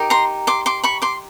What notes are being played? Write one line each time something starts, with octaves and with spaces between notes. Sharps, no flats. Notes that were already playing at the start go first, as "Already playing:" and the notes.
Already playing: D#4 G4 A#4
A#5 C6
C6 D6
C6 D6
B5 C#6
C6 D6